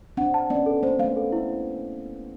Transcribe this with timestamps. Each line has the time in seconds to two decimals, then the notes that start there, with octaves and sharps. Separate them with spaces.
0.17 C4 D4 F#5
0.34 A5
0.50 B3 C#4 D5
0.66 A4
0.83 A#3 C4 C5
0.99 A3 B3 F5
1.16 A4
1.32 E4